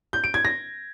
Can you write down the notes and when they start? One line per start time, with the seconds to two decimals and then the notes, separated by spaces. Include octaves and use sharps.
0.13 G6
0.24 D7
0.34 G#6
0.45 A#6